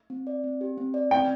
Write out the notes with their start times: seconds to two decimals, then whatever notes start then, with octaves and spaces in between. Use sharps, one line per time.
0.10 C4
0.27 D5
0.44 C4
0.61 G4
0.78 C4
0.94 D5
1.11 C4 G5